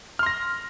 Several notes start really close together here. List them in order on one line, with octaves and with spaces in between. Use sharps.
F6 C6 A#6